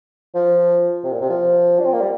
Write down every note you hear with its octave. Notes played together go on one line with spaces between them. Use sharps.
F3
C3
A#2
C3
F3
D4
C4
A#3
G3